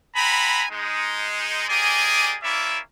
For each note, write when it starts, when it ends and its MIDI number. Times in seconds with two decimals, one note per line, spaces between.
0.15 0.65 60
0.15 0.65 78
0.15 0.65 80
0.15 0.65 82
0.15 0.65 83
0.71 1.67 56
0.71 1.67 63
1.68 2.37 58
1.68 2.37 67
1.68 2.37 68
1.68 2.37 74
1.68 2.37 75
1.68 2.37 80
2.43 2.79 58
2.43 2.79 61
2.43 2.79 64
2.43 2.79 74
2.43 2.79 76